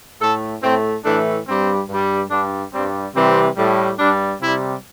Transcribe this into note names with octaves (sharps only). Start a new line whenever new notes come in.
A2 A3 A4
A2 A3 C4
A2 E3 A3 D4
G2 G3 C4
G2
G3
G2 G3 D4
G2 G3 C4
C3 E3 G3 C4
A2 G3
G2 G3 D4
C3 G3 E4